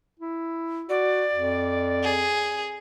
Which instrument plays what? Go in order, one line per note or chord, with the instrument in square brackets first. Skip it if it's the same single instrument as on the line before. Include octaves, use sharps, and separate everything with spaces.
[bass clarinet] E4
[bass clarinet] F#4 [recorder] D5
[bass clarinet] F2
[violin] G#4